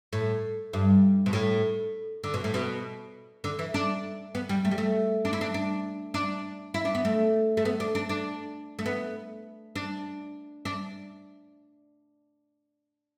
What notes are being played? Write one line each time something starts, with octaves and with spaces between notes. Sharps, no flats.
A2
G2
B2
A2
D3
B2
A2
B2
D3
E3
D4
B3
G3
A3
G3
A3
D4
E4
D4
D4
D4
E4
D4
B3
A3
A3
B3
D4
D4
D4
A3
B3
D4
D4